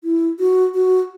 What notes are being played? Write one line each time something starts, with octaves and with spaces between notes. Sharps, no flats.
E4
F#4
F#4